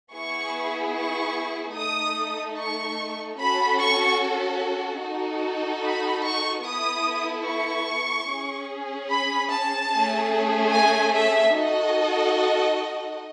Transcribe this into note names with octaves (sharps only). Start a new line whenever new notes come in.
B3 E4 G#4 C#6
C#6
A3 D#4 A4 D#6
C#6
C#4 F#4 A4 B5
C#6
D#4 F#4 A4
B5
C#6
B3 E4 A4 D#6
C#6
C#4 G#4
B5
A5
A3 C#4 G#4
G#5
E5
D#4 F#4 A4 D#5